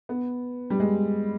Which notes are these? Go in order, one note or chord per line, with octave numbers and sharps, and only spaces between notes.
B3
G3
G#3